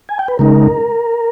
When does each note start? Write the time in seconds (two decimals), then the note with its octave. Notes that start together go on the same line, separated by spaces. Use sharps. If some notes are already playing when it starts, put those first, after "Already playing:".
0.09 G#5
0.19 G5
0.28 B4
0.39 C#3 G#3 D#4 A#4